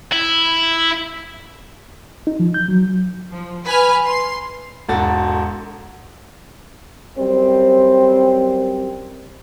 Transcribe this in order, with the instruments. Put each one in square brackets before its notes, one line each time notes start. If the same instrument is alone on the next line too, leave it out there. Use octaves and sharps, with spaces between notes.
[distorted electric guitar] E4
[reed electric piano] D#4
F3
G6
F#3
[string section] F3
B4 G#5 B5 F6
C6
[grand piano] E1 G#2 F#4 A4 A6
[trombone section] F#2 G3 C4